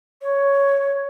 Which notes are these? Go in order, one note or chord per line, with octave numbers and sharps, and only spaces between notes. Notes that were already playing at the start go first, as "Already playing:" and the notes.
C#5